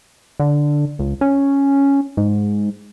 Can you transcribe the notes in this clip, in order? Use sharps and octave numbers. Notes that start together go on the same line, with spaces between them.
D3
C#2
C#4
G#2